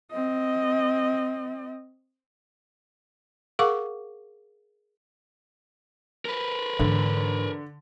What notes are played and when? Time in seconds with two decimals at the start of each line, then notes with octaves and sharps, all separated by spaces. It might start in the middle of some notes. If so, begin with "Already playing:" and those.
0.12 C4 D#5
3.59 G#4 A#4 F5 F#5 C#6 D6
6.25 A#4 B4
6.79 G#2 D3 E3